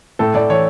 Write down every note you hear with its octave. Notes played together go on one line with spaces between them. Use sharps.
A2 A4
A2 D5
E3 C#5